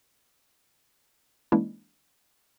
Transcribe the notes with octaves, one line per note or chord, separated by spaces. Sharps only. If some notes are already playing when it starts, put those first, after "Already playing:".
E3 G#3 A#3 C#4 D4 E4